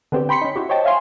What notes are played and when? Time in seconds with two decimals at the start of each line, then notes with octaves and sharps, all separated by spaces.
0.12 D3 B3 C4 D4 G4
0.29 G5 B5 C6 B6 C#7
0.41 C#4 D#4
0.56 E4 F#4 G4
0.69 C5 C#5 D#5 G5 A5
0.84 C#5 E5 F5 G#5 C6